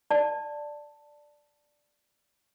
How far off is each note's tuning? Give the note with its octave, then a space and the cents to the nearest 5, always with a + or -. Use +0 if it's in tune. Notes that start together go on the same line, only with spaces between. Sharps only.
D5 +0 A5 +10